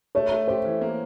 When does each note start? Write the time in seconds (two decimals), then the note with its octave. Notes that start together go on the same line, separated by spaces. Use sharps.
0.15 A3 C#5
0.31 A3
0.48 G4 C5
0.65 E3
0.81 A#3